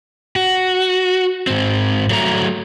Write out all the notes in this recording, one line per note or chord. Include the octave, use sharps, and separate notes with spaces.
F#4
G#2 C4
F#3 A3 A#5